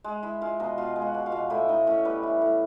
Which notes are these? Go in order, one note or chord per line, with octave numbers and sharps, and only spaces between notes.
G#3
G#3 E4 E5
G#3 F4 F5
B2 D#4 D#5
B2 F4 F5
G#3
F#4 F#5
B2
F4 F5
B2
A2 E4 E5
A2 D#4 D#5
A2 C#4 C#5
G3 B3 B4
E3
A2